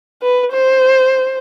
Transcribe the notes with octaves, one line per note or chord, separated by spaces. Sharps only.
B4
C5